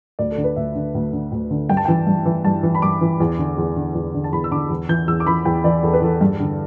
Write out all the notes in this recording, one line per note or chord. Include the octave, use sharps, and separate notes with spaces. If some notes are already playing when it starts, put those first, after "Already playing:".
D2 D5
A4
D3
B4
D2 E5
D3
D2
D3
D2
D3
G2 G5
A5
E3 G5
G2
E3
G2 A5
E3
B5
G2 D6
E3
E2
D3
E2
D3
E2
D3
A5
E2 B5
E6
D3 D6
E2
E3 G6
E2 E6
D6
E3 B5
E2 G5
E3 D5
E2 A4
B4
E3 A4
G2
D3